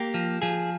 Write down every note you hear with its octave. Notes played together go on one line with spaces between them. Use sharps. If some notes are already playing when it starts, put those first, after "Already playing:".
Already playing: A#3 G4
F3
F3 G#4